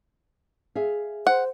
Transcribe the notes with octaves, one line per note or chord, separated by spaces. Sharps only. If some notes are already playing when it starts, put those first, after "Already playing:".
G#4 E5 F5
C5 F#5